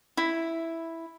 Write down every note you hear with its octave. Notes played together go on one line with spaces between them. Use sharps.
E4